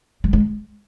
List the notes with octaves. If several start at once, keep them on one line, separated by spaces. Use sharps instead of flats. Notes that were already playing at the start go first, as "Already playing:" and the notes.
G3
G#3